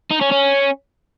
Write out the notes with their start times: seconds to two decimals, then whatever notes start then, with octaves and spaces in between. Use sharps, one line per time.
0.11 D#4
0.21 C#4
0.31 C#4